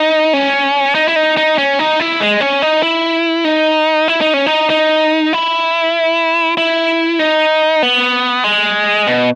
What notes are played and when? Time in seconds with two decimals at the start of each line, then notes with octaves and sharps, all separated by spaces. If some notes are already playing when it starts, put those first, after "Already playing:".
Already playing: D#4
0.33 C#4
0.95 D#4
1.08 E4
1.16 D#4
1.37 D#4
1.58 C#4
1.79 D#4
2.00 E4
2.20 G#3
2.41 C#4
2.62 D#4
2.83 E4
3.45 D#4
4.08 E4
4.21 D#4
4.34 C#4
4.46 D#4
4.70 D#4
5.33 E4
6.57 E4
7.19 D#4
7.82 B3
8.44 G#3
9.07 B2